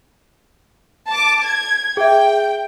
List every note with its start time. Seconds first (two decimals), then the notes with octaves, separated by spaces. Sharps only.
1.08 A5 D6
1.42 G#6
1.97 G#4 E5 G5